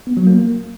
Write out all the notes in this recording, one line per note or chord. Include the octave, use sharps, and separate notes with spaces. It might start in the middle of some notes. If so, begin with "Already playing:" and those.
B3
F#3
A#3